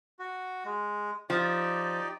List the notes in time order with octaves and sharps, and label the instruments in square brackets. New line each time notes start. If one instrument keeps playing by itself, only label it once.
[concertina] F#4
G#3
[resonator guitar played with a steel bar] F3 [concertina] D#4 G4 D5